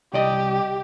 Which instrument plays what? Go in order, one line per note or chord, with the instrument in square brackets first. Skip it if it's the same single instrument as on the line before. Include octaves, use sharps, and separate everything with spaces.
[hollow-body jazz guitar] C2 D5 D#5 [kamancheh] G4